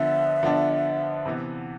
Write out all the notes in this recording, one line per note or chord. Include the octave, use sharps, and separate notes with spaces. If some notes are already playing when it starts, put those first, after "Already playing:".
Already playing: D3 F3 B3 D4 E5
D3 F3 B3 D4
C3 E3 B3